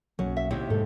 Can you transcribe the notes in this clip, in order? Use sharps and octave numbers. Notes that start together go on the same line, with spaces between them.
B1 F#2 F#3 A#3 C#5
E5
D#2 C3 E4 D#5
G#2 G#3 A4